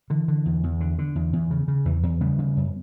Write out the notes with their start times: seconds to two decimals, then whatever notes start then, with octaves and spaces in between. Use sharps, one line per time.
0.10 D3 E3
0.28 D3
0.45 E2
0.63 E2
0.80 D3
0.98 D3
1.16 E2
1.33 E2
1.51 C#3
1.68 C#3
1.85 E2 E3
2.03 E2
2.21 C#3 G3 B3
2.38 C#3
2.57 F#2